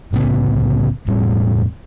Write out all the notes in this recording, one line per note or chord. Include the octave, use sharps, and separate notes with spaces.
C2 A2 C#3 B3
E1 A2 G3 C4